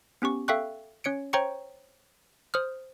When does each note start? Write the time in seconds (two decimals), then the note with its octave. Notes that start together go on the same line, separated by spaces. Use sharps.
0.22 B3 C#4 G4 C#6
0.48 A4 E5 F5 G5 C#6 F#6
1.04 C#4 C#5 C#7 D7
1.33 C5 C#5 G5 A#5 C#6 C#7
2.54 C5 D#6 F6